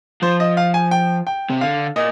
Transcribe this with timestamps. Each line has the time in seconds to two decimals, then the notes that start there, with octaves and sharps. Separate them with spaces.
0.22 F3 C5
0.40 D#5
0.57 F5
0.74 G#5
0.91 G5
1.27 G5
1.50 C3
1.61 D3 F5
1.96 A#2 D#5